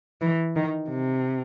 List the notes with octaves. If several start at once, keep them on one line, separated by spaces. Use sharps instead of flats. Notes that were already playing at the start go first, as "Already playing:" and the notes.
E3
D#3
C3